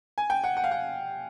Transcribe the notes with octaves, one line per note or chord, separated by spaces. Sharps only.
G#5
G5
F#5
F#5
F5
F#5